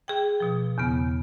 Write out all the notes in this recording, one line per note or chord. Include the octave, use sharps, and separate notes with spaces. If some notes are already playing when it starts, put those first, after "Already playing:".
G#4 G5
B2 F3
E2 C#3 B3